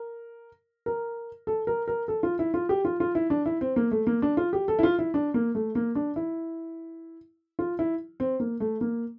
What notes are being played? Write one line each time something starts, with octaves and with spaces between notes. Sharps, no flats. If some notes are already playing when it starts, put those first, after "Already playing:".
Already playing: A#4
A#4
A4
A#4
A#4
A4
F4
E4
F4
G4
F4
F4
E4
D4
E4
C4
A#3
A3
A#3
D4
F4
G4
A4
E4
F4
E4
D4
A#3
A3
A#3
D4
E4
F4
E4
C4
A#3
A3
A#3